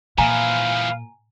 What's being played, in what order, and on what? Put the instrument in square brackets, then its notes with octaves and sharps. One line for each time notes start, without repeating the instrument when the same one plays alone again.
[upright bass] A#2 [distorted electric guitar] E3 F3 [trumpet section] F5 [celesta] G#5 A#5